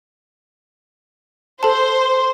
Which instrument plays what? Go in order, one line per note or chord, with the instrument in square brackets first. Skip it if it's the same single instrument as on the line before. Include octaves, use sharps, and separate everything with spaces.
[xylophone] A4 A5 [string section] C5